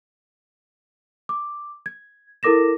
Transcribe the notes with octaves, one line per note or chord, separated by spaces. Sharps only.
D6
G#6
E4 A4 A#4 D6 A#6 E7